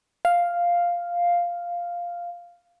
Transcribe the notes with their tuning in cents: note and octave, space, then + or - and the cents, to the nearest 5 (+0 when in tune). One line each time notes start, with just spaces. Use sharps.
F5 +0